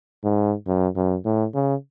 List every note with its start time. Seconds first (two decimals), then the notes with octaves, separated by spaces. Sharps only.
0.23 G#2
0.67 F#2
0.96 F#2
1.25 A2
1.54 C#3